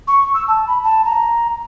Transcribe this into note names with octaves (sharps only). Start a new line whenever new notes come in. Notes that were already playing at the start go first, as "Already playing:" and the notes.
C#6
E6
A5
B5
A5
A#5